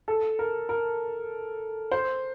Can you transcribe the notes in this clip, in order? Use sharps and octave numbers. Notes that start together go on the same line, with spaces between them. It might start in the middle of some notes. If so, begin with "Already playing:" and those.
A4
A#4
A#4
C5